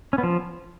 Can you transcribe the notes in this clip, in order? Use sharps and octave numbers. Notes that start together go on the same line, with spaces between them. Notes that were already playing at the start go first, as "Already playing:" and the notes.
C#4
B3
F3